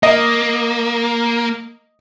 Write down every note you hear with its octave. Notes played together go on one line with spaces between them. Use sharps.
A#3 D#5